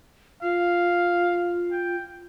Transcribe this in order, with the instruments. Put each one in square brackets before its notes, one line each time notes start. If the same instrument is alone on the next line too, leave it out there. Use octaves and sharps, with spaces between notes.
[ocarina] F4 [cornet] F5
[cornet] G5